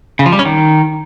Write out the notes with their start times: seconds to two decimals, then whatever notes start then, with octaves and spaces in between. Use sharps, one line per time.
0.19 C#3
0.26 F3
0.32 G3
0.39 C#4
0.45 D#3